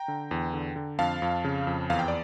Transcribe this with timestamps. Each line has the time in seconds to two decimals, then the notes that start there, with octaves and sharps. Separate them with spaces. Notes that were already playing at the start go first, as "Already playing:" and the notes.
Already playing: G5 A#5
0.08 D3
0.31 E2
0.53 D3
0.76 D3
0.99 F2 F5 A5
1.22 F2
1.44 C#3
1.67 F2
1.90 E2 F5
1.99 G5
2.08 D5